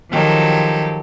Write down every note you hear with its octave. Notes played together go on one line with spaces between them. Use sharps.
D#3 F3 F#3 G4 A4